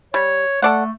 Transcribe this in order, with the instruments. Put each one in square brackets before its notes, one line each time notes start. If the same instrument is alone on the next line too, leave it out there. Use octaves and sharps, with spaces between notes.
[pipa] G3 [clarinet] C#5
[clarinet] A3 [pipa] A4 D5 F#5